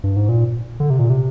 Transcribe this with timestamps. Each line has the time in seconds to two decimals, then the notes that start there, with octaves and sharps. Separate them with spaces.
0.04 G2
0.16 G#2
0.29 A#2
0.80 D3
0.90 C3
0.99 A#2
1.10 C3